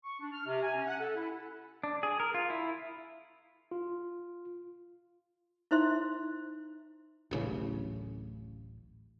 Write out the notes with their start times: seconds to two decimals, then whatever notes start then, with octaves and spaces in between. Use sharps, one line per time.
0.04 C#6
0.20 D4
0.32 F6
0.46 C3
0.62 G#5
0.75 C#4
0.87 F#5
1.00 A4
1.16 E4
1.84 D4
2.03 G#4
2.20 A#4
2.34 F4
2.50 E4
3.71 F4
5.71 D#4 E4 C5 E5 C6
7.31 D1 A1 C#3